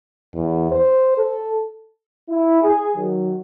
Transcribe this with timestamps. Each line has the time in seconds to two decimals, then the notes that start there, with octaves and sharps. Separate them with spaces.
0.35 E2
0.71 C5
1.18 A4
2.29 E4
2.61 G#4
2.97 D#3 F#3